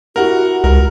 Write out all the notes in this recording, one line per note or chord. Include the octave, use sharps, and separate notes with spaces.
E4 F#4 G4 A#4 F#5
C#2 A#4